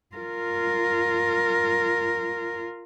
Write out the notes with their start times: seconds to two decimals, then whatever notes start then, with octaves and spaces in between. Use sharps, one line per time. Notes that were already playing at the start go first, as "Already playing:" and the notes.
0.16 F4 A#4